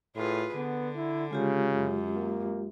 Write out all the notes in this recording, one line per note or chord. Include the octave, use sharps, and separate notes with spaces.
A2 F4 G#4 B4
D3 B3
E4
C#3 G#3 F4 G4
F#2
A#3